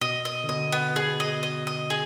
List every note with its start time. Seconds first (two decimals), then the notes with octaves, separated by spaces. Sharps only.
0.01 B2 D#5
0.25 D#5
0.44 D3
0.49 B2 D#5
0.72 B3
0.96 B2 G#4
1.20 D#5
1.43 D#5
1.67 D#5
1.90 G#4